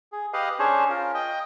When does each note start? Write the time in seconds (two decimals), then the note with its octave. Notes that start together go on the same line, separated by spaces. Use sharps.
0.12 G#4
0.33 G4 B4 D#5 F5
0.59 C#4 D4 G#4 C5 C#5
0.89 C#4 F4 A#4
1.14 D#5 G5